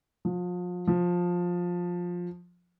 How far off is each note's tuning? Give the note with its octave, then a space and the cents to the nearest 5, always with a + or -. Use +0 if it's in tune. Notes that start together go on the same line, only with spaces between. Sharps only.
F3 +35
F3 +15